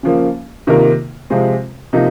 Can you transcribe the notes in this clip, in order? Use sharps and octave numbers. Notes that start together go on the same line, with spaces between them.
C#3 F3 A#3
C3 D#3 A#3 F4 A#4
C3 F3 G#3 C4 F4
C3 F3 A#3 D#4